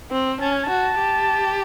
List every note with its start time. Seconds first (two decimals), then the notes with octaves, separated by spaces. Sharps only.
0.11 C4
0.40 C#4 A5
0.52 G#5
0.63 A5
0.69 F#4
0.99 G4